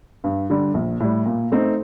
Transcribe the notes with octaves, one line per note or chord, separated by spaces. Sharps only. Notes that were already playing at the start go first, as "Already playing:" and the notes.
G2
D3 G3
A#1
A2 G3
A#2
A3 C4 D#4